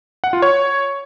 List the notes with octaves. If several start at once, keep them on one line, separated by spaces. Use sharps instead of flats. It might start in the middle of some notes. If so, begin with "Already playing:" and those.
F#5
F4
C#5